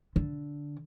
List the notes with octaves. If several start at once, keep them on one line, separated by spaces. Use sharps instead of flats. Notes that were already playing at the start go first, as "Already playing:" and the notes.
D3